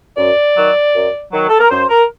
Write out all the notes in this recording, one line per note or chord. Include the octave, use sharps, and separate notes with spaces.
F#2 D5
D#3 F#3
F#2
D#3 F#3
A4
A#4
F#2 C5
A#4